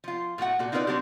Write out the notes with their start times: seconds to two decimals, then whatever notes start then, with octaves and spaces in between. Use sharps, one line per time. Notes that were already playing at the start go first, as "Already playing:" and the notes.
0.04 F3 F4
0.38 A2 A3 F#4 F#5
0.59 A#2 F#4 A4
0.72 C4 D#4 F4 A#4 B4 D5
0.87 F#3 C4 D4 F#4 G4